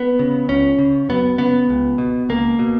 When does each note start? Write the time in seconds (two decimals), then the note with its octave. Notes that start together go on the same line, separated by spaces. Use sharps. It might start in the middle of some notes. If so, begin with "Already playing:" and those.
Already playing: B3
0.19 C#3
0.48 C#2 C#4
0.78 C#3
1.09 F#2 B3
1.38 C#3 B3
1.69 C#2
1.98 B2
2.29 C#2 A#3
2.59 B2